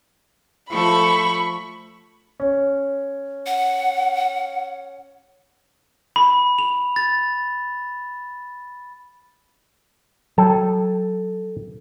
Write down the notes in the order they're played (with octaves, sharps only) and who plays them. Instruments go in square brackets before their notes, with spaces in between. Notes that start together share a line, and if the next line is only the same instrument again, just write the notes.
[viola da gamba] F3 A3 A4 [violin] B5 C#6
[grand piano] C#4
[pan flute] F#5
[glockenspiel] B5
F7
A6
[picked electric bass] F#3 [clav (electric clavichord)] A4 G5